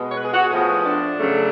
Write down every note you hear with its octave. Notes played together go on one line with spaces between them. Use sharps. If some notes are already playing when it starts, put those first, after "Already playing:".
Already playing: B2 G#3 B3
C#5
B4
G#4
F#4
G#4
A2 F3 B3
D4
C#3 F#3 A3